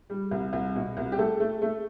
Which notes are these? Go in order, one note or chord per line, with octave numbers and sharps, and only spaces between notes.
G3
C2
C2
B2
C2
G4
A3 A4
A3
A3